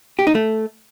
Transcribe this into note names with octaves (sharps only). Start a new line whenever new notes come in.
G4
D#4
A3